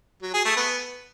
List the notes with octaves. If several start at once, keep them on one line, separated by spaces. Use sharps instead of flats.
F#3
G#4
A3
B3